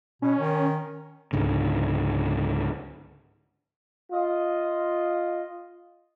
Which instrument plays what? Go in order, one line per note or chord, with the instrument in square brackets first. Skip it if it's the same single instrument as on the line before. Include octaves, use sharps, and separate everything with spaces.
[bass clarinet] B2 [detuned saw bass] C#4
[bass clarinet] D#3
[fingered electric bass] C#2 G#2 D3
[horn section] F4 D#5